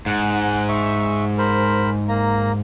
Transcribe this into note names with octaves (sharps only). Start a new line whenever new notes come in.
G#2 F#5
E5 C#6
A#4 C5 B5
A#3 A#5